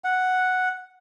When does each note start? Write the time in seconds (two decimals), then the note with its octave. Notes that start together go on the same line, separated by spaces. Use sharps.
0.04 F#5